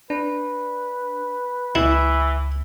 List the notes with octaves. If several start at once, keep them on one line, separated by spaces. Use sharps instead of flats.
D4 B4
C#2 E3 E4